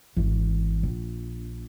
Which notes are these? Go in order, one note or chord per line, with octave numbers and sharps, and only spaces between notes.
G#1 E3
A#1